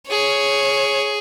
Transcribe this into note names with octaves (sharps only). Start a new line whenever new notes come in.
G#4 C#5